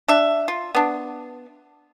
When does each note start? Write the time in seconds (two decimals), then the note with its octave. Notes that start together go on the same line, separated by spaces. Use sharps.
0.08 D4 E5
0.48 F4
0.75 B3 D4